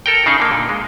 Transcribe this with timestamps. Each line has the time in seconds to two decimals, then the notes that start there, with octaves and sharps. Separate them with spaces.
0.06 A4 A#4 G5
0.26 C#3 D#4 G#4
0.40 D3 A#3
0.51 A#2
0.69 G#3